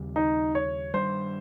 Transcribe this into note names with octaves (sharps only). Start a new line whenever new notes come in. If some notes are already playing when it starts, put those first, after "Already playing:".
Already playing: D#2 C#3 G3 C4
D#4
C#5
G2 D#3 G3 C5